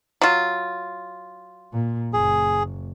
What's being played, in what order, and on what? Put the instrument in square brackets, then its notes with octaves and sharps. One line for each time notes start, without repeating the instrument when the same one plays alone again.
[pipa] F#3 F4
[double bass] A#2
[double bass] F#1 [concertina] G#4